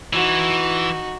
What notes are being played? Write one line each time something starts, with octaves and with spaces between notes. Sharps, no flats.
E3 D#4 F#4